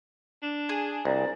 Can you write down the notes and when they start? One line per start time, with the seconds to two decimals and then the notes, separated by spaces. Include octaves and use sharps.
0.43 D4
0.69 G#4
1.05 C2 D5 A#5